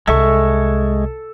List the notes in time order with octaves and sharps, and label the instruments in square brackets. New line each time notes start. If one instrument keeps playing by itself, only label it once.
[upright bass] C2 [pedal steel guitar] G#3 E5 C#6 [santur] A4